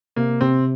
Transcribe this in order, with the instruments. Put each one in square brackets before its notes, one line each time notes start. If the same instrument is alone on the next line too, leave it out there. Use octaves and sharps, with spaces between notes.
[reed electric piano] C3 [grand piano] A#3
[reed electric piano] C3 [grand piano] C4